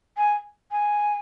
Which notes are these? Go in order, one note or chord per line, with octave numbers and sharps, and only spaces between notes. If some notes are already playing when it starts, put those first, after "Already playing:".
G#5
G#5